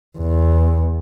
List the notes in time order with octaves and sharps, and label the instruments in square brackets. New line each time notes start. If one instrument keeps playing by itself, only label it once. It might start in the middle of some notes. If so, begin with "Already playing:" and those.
[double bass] E2